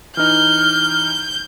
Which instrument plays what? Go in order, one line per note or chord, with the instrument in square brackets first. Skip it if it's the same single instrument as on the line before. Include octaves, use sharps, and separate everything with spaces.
[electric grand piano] E3 D#4 [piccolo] F6 [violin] G6